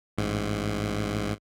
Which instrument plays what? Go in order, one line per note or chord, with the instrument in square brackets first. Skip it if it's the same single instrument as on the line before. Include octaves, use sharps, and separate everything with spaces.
[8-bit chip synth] A1 G#2